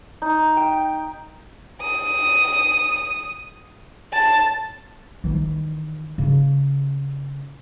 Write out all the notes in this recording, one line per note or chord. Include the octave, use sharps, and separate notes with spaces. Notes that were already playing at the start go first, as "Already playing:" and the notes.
D#4
G5
D#6
A5
D#3 E3
C#3